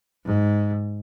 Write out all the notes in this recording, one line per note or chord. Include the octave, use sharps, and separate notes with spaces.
G#2